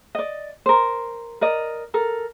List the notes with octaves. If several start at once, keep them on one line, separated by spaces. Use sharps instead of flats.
D5 D#5
A#4 C5
A#4 D5 D#5
A4 A#4